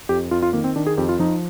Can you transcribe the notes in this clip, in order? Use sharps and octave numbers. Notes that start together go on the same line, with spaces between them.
F2 G4
F2 F4
F4
D#3 A#3
C4
D#3 D4
G#4
F2 G4
F4
F3 D#4